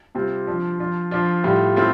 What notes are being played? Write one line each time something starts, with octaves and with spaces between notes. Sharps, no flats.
C3 G3 C4 F4
F3 D4 F4
F3 D4 F4
F3 D4 F4
A2 G3 F4
A2 A3 C4 F4